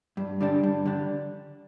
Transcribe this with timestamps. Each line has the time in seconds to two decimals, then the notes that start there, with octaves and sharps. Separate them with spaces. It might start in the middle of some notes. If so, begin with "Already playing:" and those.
0.17 G2
0.41 D3 G3 D4
0.63 G2
0.86 D3 G3 D4